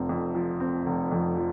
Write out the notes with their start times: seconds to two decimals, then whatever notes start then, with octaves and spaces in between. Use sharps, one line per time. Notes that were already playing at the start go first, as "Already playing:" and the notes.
Already playing: F1 C4
0.09 F2
0.35 F3
0.60 C4
0.86 F1
1.11 F2
1.37 F3